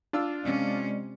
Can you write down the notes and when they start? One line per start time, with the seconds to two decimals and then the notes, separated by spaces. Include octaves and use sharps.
0.13 D4 F4 E6
0.43 C3 G#3 C#4 D5 D#5